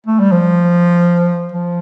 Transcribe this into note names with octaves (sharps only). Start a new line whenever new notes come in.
A3
G3
F3
F3